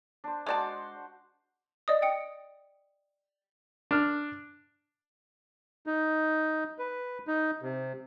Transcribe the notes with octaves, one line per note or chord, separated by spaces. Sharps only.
D4 C5
G#3 F#4 C5 D5 F#5 A5
D5 D#5 D#6
G5 D#6 C#7
D4 F6
D#4
B4
D#4
C3